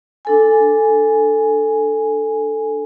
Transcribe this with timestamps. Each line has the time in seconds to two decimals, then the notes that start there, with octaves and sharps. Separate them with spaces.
0.25 D4 A4 G#5